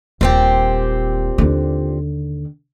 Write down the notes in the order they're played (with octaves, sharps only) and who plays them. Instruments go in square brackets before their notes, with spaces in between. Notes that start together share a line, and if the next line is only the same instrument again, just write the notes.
[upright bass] D#1 [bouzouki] A#2 C4 G4
[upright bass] D#2 D3